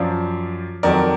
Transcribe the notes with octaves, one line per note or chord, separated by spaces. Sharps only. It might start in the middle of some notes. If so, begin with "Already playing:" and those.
Already playing: F#2 F3 D5 F5
F2 D#3 F#3 A#4 D5